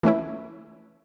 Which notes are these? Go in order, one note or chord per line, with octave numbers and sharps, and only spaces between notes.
E3 A3 C#4 E4